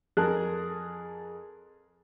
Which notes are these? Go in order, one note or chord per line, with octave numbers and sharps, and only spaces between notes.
F2 G#4 A#4 A5 F#6